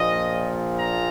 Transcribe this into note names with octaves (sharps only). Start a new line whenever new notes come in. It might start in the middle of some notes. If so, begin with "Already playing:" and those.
Already playing: A#1 A#2 F3 D#5
A#5